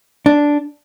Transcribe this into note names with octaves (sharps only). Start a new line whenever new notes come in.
D4